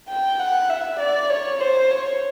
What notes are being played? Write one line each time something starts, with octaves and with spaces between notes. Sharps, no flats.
G5
F#5
E5
D5
C#5
C5
C#5